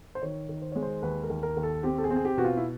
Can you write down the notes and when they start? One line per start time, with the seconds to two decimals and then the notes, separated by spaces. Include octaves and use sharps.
0.15 C5
0.22 D#3 C#5
0.49 D#3
0.62 C5
0.72 G#3 C#5
0.82 C5
1.02 D#2 B4
1.23 A#4
1.30 D#2
1.43 A#4
1.57 D#2
1.63 A4
1.83 C4 G4
1.98 A4
2.04 G#4
2.10 C4
2.16 G#4
2.25 G4
2.37 B2 F#4
2.44 F4
2.57 E4